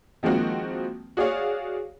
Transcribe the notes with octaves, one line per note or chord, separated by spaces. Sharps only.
D#3 F3 G#3 A#3 C4 F#4
F#4 G#4 C#5 D5 F5